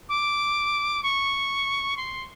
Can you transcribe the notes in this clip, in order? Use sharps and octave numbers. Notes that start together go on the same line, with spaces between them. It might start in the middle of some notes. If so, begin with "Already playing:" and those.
D6
C#6
C6